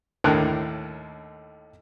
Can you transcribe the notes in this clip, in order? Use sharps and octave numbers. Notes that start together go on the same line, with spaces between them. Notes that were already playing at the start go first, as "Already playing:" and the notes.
D#2 A2 D3 A#4 F#6